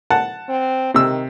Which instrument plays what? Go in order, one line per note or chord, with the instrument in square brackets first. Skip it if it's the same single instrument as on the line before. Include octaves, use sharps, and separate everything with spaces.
[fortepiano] F#5 A5
[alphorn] C4
[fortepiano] C3 E6 [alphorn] D#3